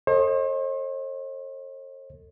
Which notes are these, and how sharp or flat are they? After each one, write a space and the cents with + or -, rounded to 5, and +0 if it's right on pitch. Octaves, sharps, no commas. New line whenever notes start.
A4 +30 C5 +45 D#5 +0